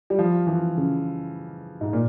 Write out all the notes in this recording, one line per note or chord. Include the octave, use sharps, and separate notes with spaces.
G3
F3
E3
C#3
G#2
A#2